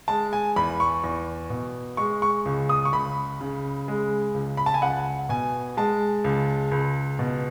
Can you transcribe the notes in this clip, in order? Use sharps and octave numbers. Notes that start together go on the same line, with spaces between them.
G#3 A5
G#5
E2 B5
C#6
E2
B2
G#3 C#6
C#6
C#2
D#6
C#6
C#2 B5
C#3
G#3
C#2
B5
A5
G#5
C#2 F#5
B2 G#5
G#3 A5
C#2
C#2
B2